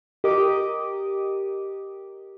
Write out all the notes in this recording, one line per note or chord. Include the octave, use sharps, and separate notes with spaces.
G4 A#4 D#5 D6 D#6